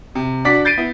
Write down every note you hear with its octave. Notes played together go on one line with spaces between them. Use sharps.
C3
D4 F#4 D5 D6 B6
G6 A6 C7 D7 D#7
B3 E4